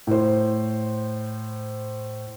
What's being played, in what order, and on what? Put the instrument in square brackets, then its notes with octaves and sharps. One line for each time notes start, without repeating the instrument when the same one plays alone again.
[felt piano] A2 C5